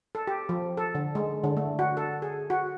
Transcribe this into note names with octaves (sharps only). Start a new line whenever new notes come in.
A4
G4
F3
A4
D3
G#3
D3
A3
F#4
A4
G#4
F#4